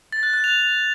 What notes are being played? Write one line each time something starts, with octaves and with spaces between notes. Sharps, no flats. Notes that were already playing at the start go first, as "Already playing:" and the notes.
A6
F#6
F#6
F7